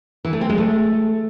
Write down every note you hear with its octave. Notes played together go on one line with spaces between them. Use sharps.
E3
A3
C4
G#3
A3